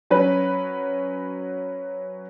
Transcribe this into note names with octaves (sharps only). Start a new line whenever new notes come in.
F#3 C#4 B4